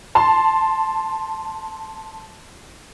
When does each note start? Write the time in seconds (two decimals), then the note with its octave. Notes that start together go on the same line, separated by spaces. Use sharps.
0.15 A5 C6